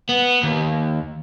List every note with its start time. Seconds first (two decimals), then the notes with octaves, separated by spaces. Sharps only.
0.09 B3
0.43 D#2